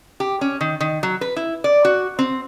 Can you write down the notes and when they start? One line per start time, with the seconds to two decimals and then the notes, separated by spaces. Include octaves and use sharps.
0.20 G4
0.41 C#4
0.61 D#3
0.80 D#3
1.03 F#3
1.21 B4
1.36 E4
1.64 D5
1.85 F#4
2.19 C4